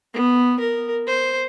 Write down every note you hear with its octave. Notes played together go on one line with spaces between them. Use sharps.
B3
A#4
C5